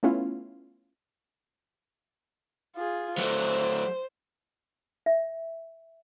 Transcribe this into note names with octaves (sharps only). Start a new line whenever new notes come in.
A3 B3 C#4 E4 F4
F4 G#4
F#3 A3 C5
E5